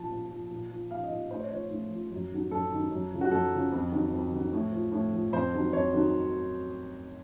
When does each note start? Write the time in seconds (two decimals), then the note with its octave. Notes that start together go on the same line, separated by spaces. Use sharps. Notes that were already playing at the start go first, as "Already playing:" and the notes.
Already playing: A#2 F3 A5
0.10 A#2
0.30 F3
0.51 A#2
0.70 F3
0.91 A#2 F5
1.04 D#5
1.11 F3
1.31 A2 C5
1.40 C#5
1.50 F3 C#5
1.71 A2
1.91 F3
2.11 F#2
2.31 D#3 F#3
2.51 F#2 A4
2.71 D#3 F#3
2.91 F#2
3.12 C#3 F3
3.21 F#4
3.31 F#2 A4
3.52 C#3 F3
3.72 F2
3.92 D#3 F#3
4.12 F2
4.32 D#3 F#3
4.53 A2
4.72 F3
4.92 A2
5.13 F3
5.32 F2 C5
5.53 D#3 F#3
5.73 F2 C#5
5.93 D#3 F#3